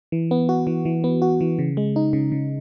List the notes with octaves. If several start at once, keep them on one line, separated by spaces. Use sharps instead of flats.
E3
B3
F#4
E3
E3
B3
F#4
E3
C#3
G#3
D#4
C#3
C#3